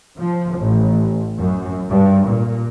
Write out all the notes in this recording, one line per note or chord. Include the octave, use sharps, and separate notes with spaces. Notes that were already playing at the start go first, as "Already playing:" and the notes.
F3
A1
F#2
G2
A#2